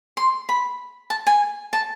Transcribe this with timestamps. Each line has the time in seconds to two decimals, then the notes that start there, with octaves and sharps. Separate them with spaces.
0.17 C6
0.49 B5
1.10 A5
1.27 G#5
1.73 A5